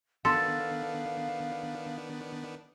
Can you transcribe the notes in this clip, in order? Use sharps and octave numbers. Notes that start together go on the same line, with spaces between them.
D#3 B3 D4 A4 F5 C6